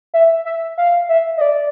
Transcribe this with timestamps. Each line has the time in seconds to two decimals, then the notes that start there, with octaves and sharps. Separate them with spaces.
0.14 E5
0.46 E5
0.78 F5
1.09 E5
1.37 D#5
1.41 D5